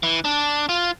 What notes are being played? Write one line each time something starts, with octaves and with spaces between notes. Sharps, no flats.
E3
D4
F4